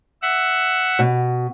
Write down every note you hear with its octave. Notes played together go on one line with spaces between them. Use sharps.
E5 F#5
B2